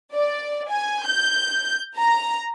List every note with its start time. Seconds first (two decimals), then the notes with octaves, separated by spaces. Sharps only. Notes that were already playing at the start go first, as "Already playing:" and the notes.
0.13 D5
0.69 G#5
1.05 G6
1.98 A#5